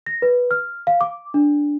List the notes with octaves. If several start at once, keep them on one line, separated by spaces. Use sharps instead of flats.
A#6
B4
F6
F5
D6
D4